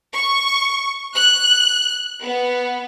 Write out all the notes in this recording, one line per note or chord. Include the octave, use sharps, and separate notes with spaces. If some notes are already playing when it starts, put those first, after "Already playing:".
C#6
F#6
B3